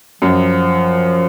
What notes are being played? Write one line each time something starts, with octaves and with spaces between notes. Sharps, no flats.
F#2 F3